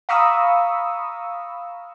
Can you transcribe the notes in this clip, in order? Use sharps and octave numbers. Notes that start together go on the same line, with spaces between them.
F5 A#5 B5 C#6 D#6 E6